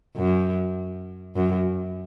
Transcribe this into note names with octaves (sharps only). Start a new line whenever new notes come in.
F#2
F#2